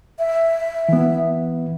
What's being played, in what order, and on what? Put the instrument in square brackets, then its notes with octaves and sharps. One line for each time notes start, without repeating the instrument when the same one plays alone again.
[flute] E5
[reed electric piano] E3 B3